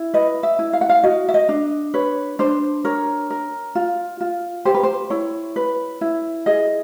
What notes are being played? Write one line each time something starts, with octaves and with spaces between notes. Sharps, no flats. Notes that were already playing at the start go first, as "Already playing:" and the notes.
Already playing: E4
B4 D#5
E5
E4
F5
F#5
F5
F#4 D#5
E5
D#5
D4
B4 C#5
D4 C5
A#4 C#5
A#4
F4
F4
G4 C5
B4
C5
E4 C#5
B4
E4
G#4 D#5